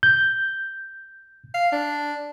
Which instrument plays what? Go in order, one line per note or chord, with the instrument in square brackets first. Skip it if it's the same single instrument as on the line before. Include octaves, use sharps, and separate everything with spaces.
[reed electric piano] G6
[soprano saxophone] F5
D4